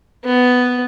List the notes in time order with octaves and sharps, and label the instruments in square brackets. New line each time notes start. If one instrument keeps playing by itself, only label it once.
[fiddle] B3